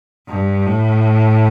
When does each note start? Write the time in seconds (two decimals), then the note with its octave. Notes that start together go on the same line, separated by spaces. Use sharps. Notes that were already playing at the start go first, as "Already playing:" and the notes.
0.29 G2
0.66 A2